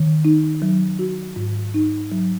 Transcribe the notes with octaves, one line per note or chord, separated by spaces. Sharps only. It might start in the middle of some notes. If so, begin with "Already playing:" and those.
Already playing: D#3
D#4
F#3
F#4
G#2
D#4
F#3